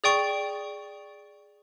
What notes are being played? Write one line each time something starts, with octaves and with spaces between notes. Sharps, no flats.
G#4 D5 G5 C#6